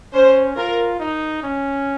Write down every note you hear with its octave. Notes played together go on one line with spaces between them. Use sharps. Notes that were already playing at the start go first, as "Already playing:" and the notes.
C#4 C5
F4 A#4
D#4
C#4